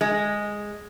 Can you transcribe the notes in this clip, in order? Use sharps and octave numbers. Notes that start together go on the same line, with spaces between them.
G#3